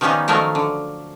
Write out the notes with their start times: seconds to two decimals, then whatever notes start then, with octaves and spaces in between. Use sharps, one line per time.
0.01 D#3 F3 G3 B3 C#4 D#4
0.28 D#3 F3 F#3 A3 A#4
0.55 D3